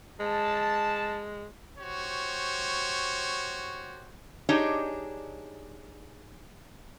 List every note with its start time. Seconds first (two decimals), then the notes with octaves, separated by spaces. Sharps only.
0.20 G#3 A5
1.79 F#4 G4 C5 C#5
4.49 D4 D#4 G4 G#4 C#5 D#5